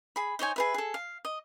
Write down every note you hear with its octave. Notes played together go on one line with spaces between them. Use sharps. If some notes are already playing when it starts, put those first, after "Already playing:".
G#4 B5
D#4 C5 C#5 G#5
G#4 B4 E5
G#4 A4
F5
D#5